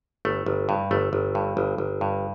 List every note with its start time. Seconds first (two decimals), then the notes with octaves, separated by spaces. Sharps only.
0.25 G1 A3
0.46 G1
0.69 G2
0.91 G1 A3
1.13 G1
1.35 G2
1.57 G1
1.78 G1
2.01 G2